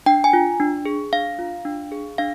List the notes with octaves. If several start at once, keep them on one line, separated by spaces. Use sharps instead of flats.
D4 G5
G#5
F4
D4
G#4
D4 F5
F4
D4
G#4
D4 F5